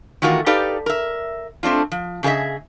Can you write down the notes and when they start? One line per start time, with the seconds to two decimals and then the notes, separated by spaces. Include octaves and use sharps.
0.22 D#3 E3 A3 F4 F#4 A#4
0.46 D#4 G4 A4 B4 D5 F5
0.86 A#4 E5
1.63 A3 C4 D4 F4
1.92 F3
2.23 C#3 G#4 A#4 D#5 E5